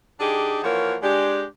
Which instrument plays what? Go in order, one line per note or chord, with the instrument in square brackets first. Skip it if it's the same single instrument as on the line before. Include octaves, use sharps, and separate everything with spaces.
[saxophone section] D3 D4 D#4 G4 G#4
E3 F3 A#3 F#4 A#4 C#5
G#3 D4 G4